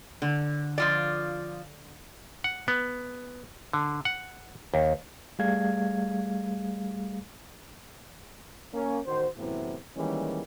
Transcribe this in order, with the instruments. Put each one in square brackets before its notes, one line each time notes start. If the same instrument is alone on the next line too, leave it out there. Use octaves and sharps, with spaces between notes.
[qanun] D3
[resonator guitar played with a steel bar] F3 F4 D5
[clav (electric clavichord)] F#5
B3
D3
F#5
D#2
[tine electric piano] G3 A3 G#4 F5 G#6
[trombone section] A#3 C#4
A1 D#3 F#4 C5
F#2 A2 C3 E3 B3 E4
D#3 E3 G3 G#3 A#3 C#4